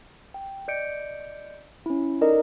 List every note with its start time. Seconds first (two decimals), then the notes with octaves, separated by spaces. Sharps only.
0.34 G5
0.68 D5 D#5 G6 C#7 D7
1.86 C#4 E4
2.21 D#4 A4 A#4 D5 D#5